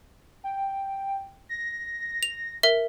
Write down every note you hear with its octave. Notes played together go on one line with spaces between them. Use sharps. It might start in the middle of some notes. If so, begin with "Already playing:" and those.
G5
A#6
F7
A#4 E5